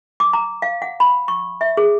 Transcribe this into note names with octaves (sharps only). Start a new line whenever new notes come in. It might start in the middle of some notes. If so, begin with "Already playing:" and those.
D6
A#5
F5
F#5
B5
C#6
E5
G#4